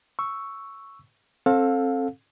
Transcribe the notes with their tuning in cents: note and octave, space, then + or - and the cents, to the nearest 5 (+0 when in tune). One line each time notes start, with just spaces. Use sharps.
C#6 +0 E6 +0
C4 +30 A4 +0 F5 +30